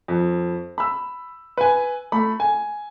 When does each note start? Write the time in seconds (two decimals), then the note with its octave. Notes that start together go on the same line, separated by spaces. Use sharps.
0.08 F2
0.78 B5 E6
1.57 B4 G#5
2.12 A3 B5
2.40 G#5